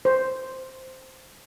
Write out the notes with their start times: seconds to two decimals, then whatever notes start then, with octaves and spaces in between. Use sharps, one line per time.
0.05 C5